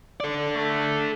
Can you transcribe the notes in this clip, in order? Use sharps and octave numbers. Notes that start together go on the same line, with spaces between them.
A4 D5
A3